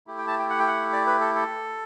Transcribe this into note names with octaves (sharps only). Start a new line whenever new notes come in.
A3 E4 G4
G5
A5
G5
F#5
G5
F#5
D5
B4
A4
A4